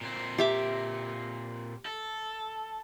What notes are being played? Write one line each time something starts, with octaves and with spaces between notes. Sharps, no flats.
A#2 C4
G4 E5 D6
A4